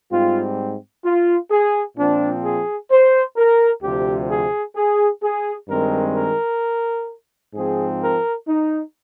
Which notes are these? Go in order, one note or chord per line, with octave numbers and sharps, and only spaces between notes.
G#2 G3 C4 F4
F4
G#4
A#2 F3 C4 D4
G#4
C5
A#4
D2 C3 F3 G4
G#4
G#4
G#4
G2 D#3 G#3 C4 A#4
A#4
G#2 F3 C4 G#4
A#4
D#4